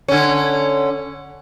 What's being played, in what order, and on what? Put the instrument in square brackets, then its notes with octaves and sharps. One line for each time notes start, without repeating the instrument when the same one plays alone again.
[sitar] D3 C#4